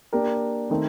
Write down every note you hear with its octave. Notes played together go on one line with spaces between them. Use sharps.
A#3 D4 G4 A#4
D#3 A3 C4 D#4 A#4